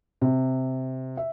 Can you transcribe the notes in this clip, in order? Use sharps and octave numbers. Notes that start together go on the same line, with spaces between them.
C3
E5